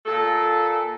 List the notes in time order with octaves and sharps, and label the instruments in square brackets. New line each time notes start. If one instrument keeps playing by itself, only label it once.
[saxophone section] A#2 A4